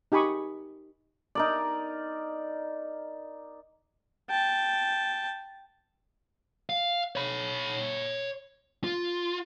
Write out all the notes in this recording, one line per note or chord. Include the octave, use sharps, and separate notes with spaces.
D#4 G4 G#5 B5 C#6 D#6
D#4 A#4 D5
G5 A5
F5
C#5 B5
F4